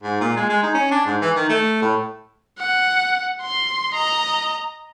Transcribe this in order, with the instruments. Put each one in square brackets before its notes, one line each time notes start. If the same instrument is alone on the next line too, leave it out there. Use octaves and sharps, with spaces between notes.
[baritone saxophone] G#2
A#2
G#3
G#3
D#4
C#4
D4
G#2
E3
D#3
A3
A2
[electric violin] F#5
C6
D#5 A#5